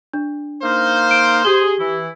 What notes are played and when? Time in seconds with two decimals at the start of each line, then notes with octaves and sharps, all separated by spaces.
0.14 D4
0.63 A#3 D#4 C5 F5
1.11 D7
1.45 G4 G#4 G7
1.79 E3 E4